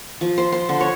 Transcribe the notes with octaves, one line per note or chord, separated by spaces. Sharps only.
F3
C5
C5
D3
C#5